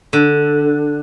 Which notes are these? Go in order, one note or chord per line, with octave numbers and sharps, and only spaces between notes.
D3